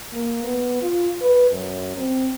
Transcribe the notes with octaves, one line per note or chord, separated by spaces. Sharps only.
A#3
B3
F4
B4
F#2
C4